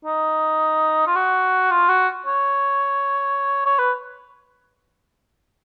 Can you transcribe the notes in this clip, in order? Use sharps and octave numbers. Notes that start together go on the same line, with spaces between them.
D#4
F4
F#4
F4
F#4
C#5
C#5
B4